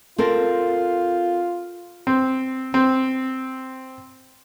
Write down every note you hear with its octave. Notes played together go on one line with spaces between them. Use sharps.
C4 F4 A4 A#4
C4
C4